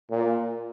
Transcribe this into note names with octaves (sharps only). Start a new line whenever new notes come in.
A#2